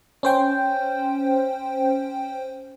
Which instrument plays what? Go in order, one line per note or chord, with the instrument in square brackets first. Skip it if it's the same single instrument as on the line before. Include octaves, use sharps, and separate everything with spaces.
[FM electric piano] C#4 C5 G5